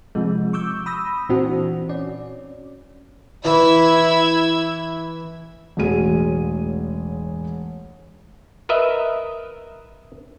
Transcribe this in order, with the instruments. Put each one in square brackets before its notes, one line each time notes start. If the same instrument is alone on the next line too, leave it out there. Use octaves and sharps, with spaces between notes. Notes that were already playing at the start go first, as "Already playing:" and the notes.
[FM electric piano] C3 F3 G#3
C#6 D6 E6 G6
B5 D#6 E6 A#6
A#2 E3 C4 D4 F#4
C#4 D5
[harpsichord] E3 [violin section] E4 E6 G#6
[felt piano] E1 A1 G#4 D#7
[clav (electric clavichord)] A#4 B4 D#5 E5